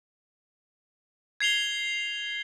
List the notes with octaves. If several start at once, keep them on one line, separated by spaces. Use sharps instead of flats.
G#6 C7 F7 G7